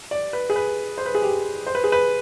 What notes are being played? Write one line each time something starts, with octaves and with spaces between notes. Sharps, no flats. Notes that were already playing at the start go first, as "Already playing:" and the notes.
D5
B4
G#4
B4
C5
B4
G#4
G4
C5
B4
G#4
B4